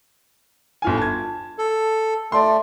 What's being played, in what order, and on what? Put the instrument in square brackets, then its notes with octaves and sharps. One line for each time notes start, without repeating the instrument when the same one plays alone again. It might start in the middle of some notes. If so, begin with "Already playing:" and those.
[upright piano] G1 F4 G#5
A5 G#6
[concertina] A4
[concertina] A3 [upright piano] D5 C6